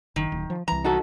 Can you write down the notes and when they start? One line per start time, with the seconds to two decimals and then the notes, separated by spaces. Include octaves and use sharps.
0.16 F#1 D#3
0.32 D1
0.50 F3
0.68 C2 E3 A#5
0.85 D#4 F#4 A4